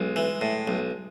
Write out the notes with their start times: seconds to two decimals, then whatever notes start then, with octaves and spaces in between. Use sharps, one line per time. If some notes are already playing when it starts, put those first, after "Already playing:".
Already playing: B1 G#3
0.16 E3
0.41 A2
0.67 B1